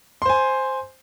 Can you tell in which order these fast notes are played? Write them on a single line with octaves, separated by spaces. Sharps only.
C6 C5 G#5